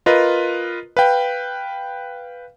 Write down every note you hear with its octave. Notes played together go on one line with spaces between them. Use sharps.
F4 A#4 B4 D#5
B4 F5 G5